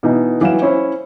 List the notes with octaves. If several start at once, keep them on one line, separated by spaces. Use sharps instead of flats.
B2 E3 D#4
E3 F#3 F5 E7
C#4 E4 C5 C#5